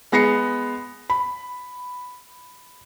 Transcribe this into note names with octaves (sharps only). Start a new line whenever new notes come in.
G#3 B3 A#6 C7 C#7
B5